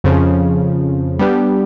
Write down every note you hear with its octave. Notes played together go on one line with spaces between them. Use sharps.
F2 C#3 F3
G3 B3 D4 G4